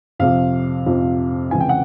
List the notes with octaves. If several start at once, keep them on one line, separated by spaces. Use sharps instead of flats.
F2 C3 F3 F5
F2 C3 F3
C#2 C3 E3 G#5
G5
F#5